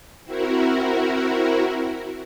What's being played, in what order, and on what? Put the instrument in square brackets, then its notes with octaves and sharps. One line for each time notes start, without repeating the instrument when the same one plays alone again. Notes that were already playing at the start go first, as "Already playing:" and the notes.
[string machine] C4 E4 F#4 A#4